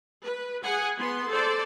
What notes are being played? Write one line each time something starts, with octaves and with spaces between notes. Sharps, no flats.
B4
G#4 F#5 G#5
B3 C6
A4 C5 D5